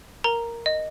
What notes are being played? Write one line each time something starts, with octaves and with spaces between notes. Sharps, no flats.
A#4 A#5
D#5